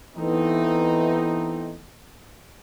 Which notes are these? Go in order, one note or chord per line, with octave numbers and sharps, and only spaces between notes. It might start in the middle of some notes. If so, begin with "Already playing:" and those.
E3 A3 B3 C4 D#4